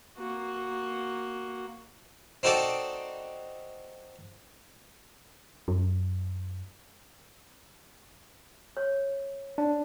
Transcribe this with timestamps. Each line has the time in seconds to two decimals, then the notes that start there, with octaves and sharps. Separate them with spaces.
0.18 A#3 F#4
2.43 C4 D#4 F#4 A4 D5 A5
5.68 F#2
8.77 C#5
9.58 D4